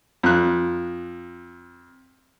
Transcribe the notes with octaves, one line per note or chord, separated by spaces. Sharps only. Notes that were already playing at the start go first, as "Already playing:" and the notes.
F2 F#6